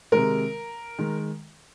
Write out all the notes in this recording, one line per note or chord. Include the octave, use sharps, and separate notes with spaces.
C3 D#3 G#3 A#4
D#3 G#3